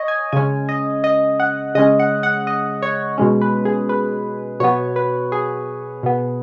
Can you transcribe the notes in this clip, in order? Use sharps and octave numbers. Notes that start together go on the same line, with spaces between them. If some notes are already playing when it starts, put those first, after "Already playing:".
Already playing: C#5 D#5
G#5
C#3 G#3 C#4 G#5
D#5
D#5
F#5
C#3 G#3 C#4 D#5
F#5
F#5
D#5
C#5
B2 G#3 C#4
B4
G#4
B4
B2 F#3 B3 C#5
B4
G#4
B2 B3